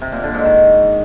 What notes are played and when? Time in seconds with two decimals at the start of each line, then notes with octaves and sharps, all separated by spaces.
0.02 C3
0.12 A#2
0.23 D3
0.34 G#2
0.45 D#3